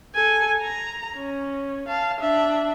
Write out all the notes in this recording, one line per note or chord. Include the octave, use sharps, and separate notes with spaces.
A4 G#5
A#5
C#4
F5 A5
D4 E5